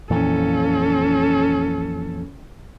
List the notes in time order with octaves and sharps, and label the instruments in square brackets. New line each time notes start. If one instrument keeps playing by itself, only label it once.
[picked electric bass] F2 A#2 E3 [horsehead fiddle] C#4 A4